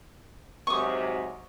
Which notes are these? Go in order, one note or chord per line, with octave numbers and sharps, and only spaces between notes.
G#2 C3 F#3 C#6 D#6